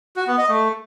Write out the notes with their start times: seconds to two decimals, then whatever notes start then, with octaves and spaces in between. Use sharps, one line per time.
0.16 F#4
0.27 B3
0.38 D#5
0.49 A3